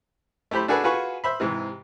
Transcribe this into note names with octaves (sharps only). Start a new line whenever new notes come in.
A3 E4 G4 C5 B5
D4 F#4 G#4 A4 B4
F4 F#4 G#4 B4 C#6
C5 E5 B5
G#2 C3 E3